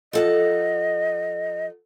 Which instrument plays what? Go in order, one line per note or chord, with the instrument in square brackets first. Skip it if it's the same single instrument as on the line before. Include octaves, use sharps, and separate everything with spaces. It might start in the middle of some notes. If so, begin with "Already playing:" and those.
[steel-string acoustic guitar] F3 A4 F#5 [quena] D#5